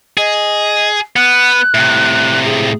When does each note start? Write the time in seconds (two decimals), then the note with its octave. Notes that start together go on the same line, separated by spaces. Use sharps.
0.18 G#4 D#5
1.16 B3 F#6
1.74 A2 C3
2.45 G#4